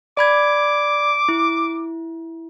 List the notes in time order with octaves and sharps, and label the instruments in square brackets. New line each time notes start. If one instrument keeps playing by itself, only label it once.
[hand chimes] D5 B5 G#6 [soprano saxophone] D6
[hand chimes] E4